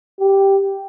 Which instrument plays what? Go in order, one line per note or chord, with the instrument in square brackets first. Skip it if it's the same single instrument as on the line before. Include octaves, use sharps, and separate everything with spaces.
[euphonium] G4